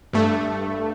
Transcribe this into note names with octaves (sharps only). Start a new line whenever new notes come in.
G2 A3